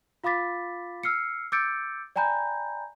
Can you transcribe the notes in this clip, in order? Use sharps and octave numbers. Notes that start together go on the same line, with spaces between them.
F4 F5 B5 D6 A6 B6
E6 F6 C7 C#7
D6 E6 G6 A6 C#7 D7
D5 G5 G#5 A#5 B5 G6